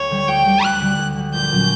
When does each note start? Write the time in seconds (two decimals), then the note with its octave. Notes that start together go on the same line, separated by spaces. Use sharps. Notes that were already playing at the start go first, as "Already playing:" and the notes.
Already playing: D2 C#5
0.11 D3 G3
0.28 D2 G5
0.46 D3 G3
0.64 D2 F#6
0.81 D3 G3
0.99 D2
1.17 D3 G3
1.34 A#1 G6
1.52 A#2 F#3 C#4